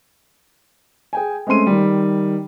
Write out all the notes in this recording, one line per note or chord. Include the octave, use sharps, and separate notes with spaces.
G#4 G5 G#5
G#3 A3 C4 C#4 C6 D#7
D#3 G3